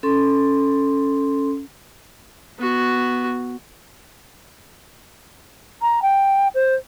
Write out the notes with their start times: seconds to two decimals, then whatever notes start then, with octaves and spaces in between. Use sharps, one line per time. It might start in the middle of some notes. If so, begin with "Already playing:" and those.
0.03 C#4 A4 C6
2.59 B3 F#4
5.82 A#5
6.02 G5
6.54 C5